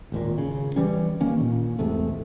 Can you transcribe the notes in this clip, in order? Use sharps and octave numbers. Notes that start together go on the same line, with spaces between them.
G#1 D#2 A#2
C#3
E3 G3 C#4
D#3 A#3 C#4
A#2
E2 G#2 C3 A3